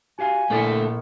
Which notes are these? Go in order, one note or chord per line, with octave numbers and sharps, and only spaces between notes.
F#4 G4 F5 G#5
A#1 A#2 A3 A#3 D4 E4 A6 C#7